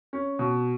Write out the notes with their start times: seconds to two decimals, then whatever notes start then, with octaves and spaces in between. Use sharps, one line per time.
0.13 C#4
0.39 B2